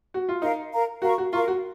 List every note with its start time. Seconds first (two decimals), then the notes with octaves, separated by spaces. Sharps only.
0.14 F#4
0.29 F4
0.41 D#4 A#4 F5 A#5
0.72 A#4 F5 A#5
1.02 F#4 A#4 F5 A#5 C#6
1.18 F#4
1.32 F4 A#4 F5 A#5 C#6
1.48 F#4